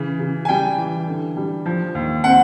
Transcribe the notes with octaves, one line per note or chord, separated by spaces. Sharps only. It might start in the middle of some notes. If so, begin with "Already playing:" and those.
Already playing: C#3 E3
C#3
G#5
G3 G5
E3
D3
G3
F3
D#2
C4 F#5